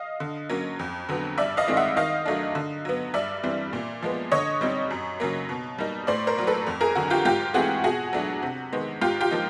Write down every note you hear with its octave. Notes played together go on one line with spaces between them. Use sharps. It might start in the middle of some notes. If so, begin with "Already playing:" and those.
Already playing: D#5 F5
D3
F#3 A#3 C#4
F2
D3 F#3 B3
G2 D5 E5
D#5 F5
D#3 G#3 C4 E4
E5 F#5
D#3 D#5 F5
F#3 A3 D4
D3
F#3 B3
G2 D5 E5
E3 G3 C4
A#2
F3 G#3 B3
D3 C#5 D#5
G3 C4 D#4
F#2
C#3 F#3 A#3
B2
G3 A#3 D#4
A2 C5 D5
A#4 C5
F#3 A#3
A4 B4
F2
G#4 A#4
D3 F#3 F#4
F4 G4
G#2 F4 G4
E3 A3 C4 F#4 G#4
B2 F#4 G#4
F#3 A3 D4
C3
D#3 G#3 B3
G#2 F4 G4
F4 G4
F3 A#3 D#4